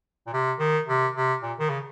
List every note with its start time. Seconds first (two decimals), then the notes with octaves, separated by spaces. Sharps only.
0.27 A#2
0.33 C3
0.60 D#3
0.88 C3
1.15 C3
1.43 A#2
1.59 D#3
1.69 C#3